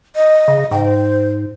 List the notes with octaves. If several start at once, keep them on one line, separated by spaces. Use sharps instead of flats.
D#5
C#3
G#2 G5
C5